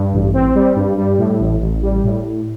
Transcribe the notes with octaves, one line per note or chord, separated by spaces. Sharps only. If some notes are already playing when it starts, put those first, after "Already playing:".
Already playing: G2
A1
C4
G3
G2
G3
A2
A1
A1
G3
A2